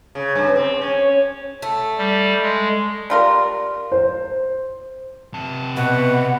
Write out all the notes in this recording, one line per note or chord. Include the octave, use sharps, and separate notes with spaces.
C#3
G2
C4
C#4
A3
G3
G#3
G3 F4 A#4
C5
C3 A5
B2 B4 F#5